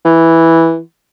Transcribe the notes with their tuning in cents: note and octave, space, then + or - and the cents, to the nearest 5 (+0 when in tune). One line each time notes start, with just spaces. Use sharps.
E3 -5